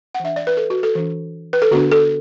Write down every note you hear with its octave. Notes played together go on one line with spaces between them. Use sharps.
F#5
E3 D4 E5
D5
B4
A4
F#4
A4
E3 D4
B4
A4
D3 B3 D4 F#4
A4